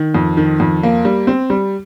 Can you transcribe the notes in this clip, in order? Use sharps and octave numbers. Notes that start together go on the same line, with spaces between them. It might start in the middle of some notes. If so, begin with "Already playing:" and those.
Already playing: D#3
F2
D#3
F2
A#3
G3
C4
G3